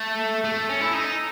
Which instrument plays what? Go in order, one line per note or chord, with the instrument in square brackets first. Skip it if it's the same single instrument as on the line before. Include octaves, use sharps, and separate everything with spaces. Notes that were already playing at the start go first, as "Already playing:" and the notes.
Already playing: [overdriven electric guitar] A3
A3
C#4
E4
D#4